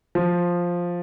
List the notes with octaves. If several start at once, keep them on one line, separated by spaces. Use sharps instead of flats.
F3